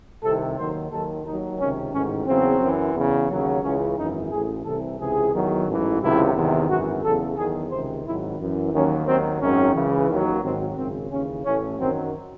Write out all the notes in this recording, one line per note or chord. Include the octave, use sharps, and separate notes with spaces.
C2 C3 D#3 A4
D#2 D#3 F#3 C5
D#2 D#3 F#3 A4
D#2 D#3 F#3 D#4
C#2 C3 D#3 C#4
A1 G#2 D#3 C#4
E2 C#3 F#3 C4
F#2 E3
E2 C#3 E3
D#2 C#3 F#3
C#2 C#3 E3 C#4
G#1 F#2 E3 D#4
A1 A2 E3 G#4
C2 C3 E3 A4
C#2 C3 E3 G#4
E2 D#3 F#3
A1 G#2 E3
C#2 C3 D#3 F#3 E4
E2 C3 D#3
G#1 F#2 E3 F#4
E2 C#3 F#3 A4
E2 D#3 F#3 G#4
C#2 C3 D#3 C5
G#1 G#2 D#3 F#3 E4
F#2 E3
D#2 D#3 F#3 C#4
D#2 D#3 F#3 C4
G#1 F#2 D#3 F#3 C#4
C#2 C#3 E3
D#2 D#3 F#3
G#1 G#2 D#3 F#3 C4
G#1 F#2 C#3 C4
D#2 C#3 E3 C#4
A1 A2 E3 C#4
F#2 D#3 F#3 C4